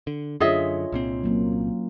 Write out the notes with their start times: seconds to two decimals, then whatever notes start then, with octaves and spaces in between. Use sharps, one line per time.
0.07 D3
0.40 F#2 D3 D4 F4 G#4 C#5 D#5 E5
0.92 C2 A#2 C4
1.23 F#3 A#3 C#4